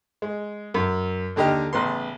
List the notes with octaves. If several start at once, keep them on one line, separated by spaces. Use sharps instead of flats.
G#3
F#2
D#2 D3 G4 D#5 A#5 F6
A1 C#3 B3 C6